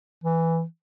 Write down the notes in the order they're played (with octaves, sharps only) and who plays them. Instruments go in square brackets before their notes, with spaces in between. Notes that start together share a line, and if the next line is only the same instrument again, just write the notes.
[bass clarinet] E3